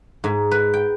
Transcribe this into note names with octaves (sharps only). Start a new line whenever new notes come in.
G#2
B4
G5